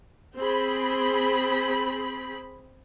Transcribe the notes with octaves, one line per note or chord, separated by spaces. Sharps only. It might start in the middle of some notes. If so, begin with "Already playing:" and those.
C4 G#4 B5